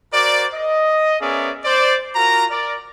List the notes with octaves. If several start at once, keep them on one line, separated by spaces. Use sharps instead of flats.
F#4 A#4 C5 D5
D#5
B3 C#4 G#4 A#4 D5 E5
C5 D5
F4 F#4 A#4 A#5
A#4 D5